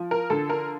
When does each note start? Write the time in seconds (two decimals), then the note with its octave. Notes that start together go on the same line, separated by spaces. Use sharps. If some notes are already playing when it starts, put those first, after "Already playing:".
Already playing: F3
0.11 A#4
0.30 D3 A4
0.50 A#4